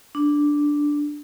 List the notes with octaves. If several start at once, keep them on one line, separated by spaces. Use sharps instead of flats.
D4